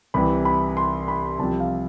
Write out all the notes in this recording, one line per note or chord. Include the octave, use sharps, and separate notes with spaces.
C2 C3 E3 B5
B5
C6
B5
C2 C3 F3 A5
F5